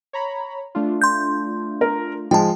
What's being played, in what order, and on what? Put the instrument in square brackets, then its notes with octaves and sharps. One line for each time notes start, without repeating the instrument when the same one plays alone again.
[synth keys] C#5 A#5 B5
A3 D4 F4
[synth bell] C6 G6
[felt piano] A#4
[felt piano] F3 G#3 [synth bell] G5 A5